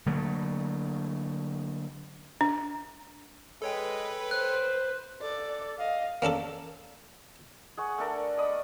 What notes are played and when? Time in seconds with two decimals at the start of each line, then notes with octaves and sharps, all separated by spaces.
0.06 D3 F#3 A3 A#3
2.41 D4
3.62 G#3 A4 B4 C#5 G5
4.31 C5 F#6
5.22 A4 D5
5.79 D#5 F5
6.22 A#3 C#4 D4 A4
7.77 G#4 F#5 C#6
7.98 A3 D4 A4 A#4
8.37 D5 D#5 B5 D#6